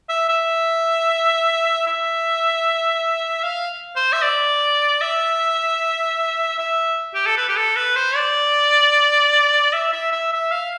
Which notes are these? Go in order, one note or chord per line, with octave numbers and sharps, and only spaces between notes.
E5
E5
E5
F5
C5
E5
D5
E5
E5
G4
A4
B4
G4
A4
B4
C5
D5
E5
E5
E5
E5
F5